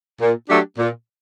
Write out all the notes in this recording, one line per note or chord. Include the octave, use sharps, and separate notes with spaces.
A#2
F#3 A3 D4 G4
A#2